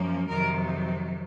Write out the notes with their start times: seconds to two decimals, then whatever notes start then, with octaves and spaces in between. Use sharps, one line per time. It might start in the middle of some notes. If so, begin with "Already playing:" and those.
Already playing: F#2 F3 A#3 C#4
0.28 F2 C3 D#3 F#3 A#4